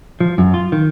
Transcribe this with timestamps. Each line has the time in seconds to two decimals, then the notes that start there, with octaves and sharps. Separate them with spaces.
0.20 F3
0.38 F#2
0.54 F4
0.72 D#3